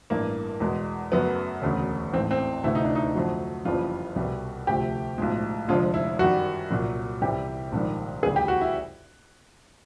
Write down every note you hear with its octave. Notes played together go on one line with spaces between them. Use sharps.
A1 G2 E3 A#3
E2 B2 G#3
F#2 C#3 F#3 A3 B3
E1 D2 C#3
A1 G#2 E3 A3 C4
C4
D2 C3 E3 A3 E4
D#4
D4
D#4
F2 D3 F#3 A3
F#1 F2 C#3 E3 G3 F4
C2 B2 G3
D2 C3 F3 A3 G4
B1 A2 F3 G#3
F1 F2 D3 F3 G#3 F4
E4
F#2 D#3 G3 F#4
C2 A#2 F#3
C2 C3 E3 G3 G4
A#1 G#2 D#3 G3
D2 C#3 E3 G3 G#4
G4
F#4
E4